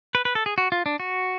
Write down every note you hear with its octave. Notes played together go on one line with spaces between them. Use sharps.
B4
B4
A4
G#4
F#4
F4
D4
F#4